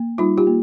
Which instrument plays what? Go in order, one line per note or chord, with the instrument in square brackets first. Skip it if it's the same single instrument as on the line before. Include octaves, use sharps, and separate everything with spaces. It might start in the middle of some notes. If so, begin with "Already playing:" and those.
Already playing: [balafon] A#3
G3 D#4 F4
F4 G4
A#3